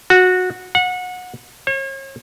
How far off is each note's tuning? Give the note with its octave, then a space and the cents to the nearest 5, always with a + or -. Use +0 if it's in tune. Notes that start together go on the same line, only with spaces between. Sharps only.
F#4 -15
F#5 -25
C#5 -40